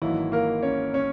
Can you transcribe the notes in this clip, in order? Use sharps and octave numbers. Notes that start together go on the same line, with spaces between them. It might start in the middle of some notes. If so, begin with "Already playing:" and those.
G#1 G#2 E3 F#3 A#3 E4
A#3 A#4
C#4 C#5
C#4 C#5